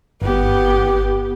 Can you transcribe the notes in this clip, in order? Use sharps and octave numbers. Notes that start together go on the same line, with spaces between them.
G1 B3 G4